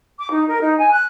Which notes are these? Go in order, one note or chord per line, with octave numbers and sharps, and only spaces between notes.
D6
D#4
A#4
D#4
G#5
F#6